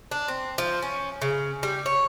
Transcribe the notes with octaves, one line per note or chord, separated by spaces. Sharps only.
D4
C4
F3
C#4
C#3
G3
C#5